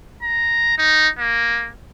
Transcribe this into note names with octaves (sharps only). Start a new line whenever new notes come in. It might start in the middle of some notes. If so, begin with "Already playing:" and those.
A#5
D#4
A#3